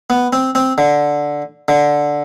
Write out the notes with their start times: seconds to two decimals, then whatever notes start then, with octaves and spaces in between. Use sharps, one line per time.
0.10 B3
0.33 C4
0.55 C4
0.78 D3
1.68 D3